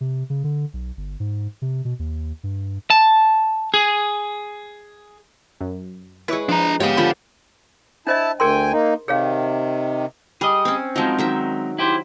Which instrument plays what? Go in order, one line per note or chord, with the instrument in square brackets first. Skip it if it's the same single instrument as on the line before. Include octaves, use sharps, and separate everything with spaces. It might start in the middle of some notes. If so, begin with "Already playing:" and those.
[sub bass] C3
C#3
D3
B1
G1
G#2
C3
B2
D#2
G2
[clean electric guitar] A5
G#4
[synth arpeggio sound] F#2
[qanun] G#3 B4 [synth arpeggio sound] E4 C#5 C#6
[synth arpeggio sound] F3 [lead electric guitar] D4 A#5
[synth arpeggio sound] G#2 G#3 [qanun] B3 G4 [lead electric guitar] C#5 F5
[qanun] D3 F3 D4 [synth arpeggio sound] B5
[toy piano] D4 C5 D#5 [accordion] E4 A5
[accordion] D2 G5 G#5 [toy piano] G#4 A#4 C6
[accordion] A#3 D#4
[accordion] C3 D#3 [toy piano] G#4 C#5 F5
[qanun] G3 [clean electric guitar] G#4 D#5
[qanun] C4 C#4
[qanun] F3 F#3 [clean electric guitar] G#3 C4 D#4
[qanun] D#3 F#3 E5
[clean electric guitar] E4 G4 C5